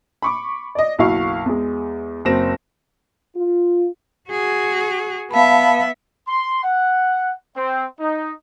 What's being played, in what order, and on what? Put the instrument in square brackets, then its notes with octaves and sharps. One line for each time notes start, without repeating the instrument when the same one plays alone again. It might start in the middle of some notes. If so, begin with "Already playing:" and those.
[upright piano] B5 C#6 D6
D5 D#5
F#1 B1 E4 F#4 F5 C#6
E2 G#3
F#1 C4 A#6 E7
[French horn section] F4
[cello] F#4 G#4
[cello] B3 E5 [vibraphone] F5 A5 B5
[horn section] C6
F#5
C4
D#4